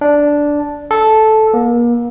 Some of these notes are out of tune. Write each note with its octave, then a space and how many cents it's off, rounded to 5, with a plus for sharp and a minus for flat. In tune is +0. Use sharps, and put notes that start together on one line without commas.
D4 -5
A4 -10
A#3 +35